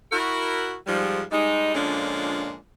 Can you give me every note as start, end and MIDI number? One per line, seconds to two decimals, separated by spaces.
0.12 0.74 64
0.12 0.74 66
0.12 0.74 70
0.87 1.22 44
0.87 1.22 53
0.87 1.22 55
1.31 1.74 55
1.31 1.74 56
1.31 1.74 63
1.74 2.56 46
1.74 2.56 50
1.74 2.56 53
1.74 2.56 56
1.74 2.56 61
1.74 2.56 62